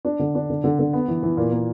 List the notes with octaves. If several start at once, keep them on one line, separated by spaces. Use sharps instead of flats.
D4
D3
D4
D3
D3
D3
B3
E3
E3
A#2
A#3